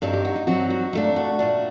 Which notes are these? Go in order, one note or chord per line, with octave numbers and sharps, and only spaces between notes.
G2 F#3 C4 D#4 A4
G4
F#4
D#4
G2 F#3 C4 D#4 F#4
F#4
A#2 A3 D4 D#4
F#4
A#2 A3 D4